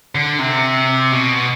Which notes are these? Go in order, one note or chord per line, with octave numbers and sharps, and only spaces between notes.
D3
C3
B2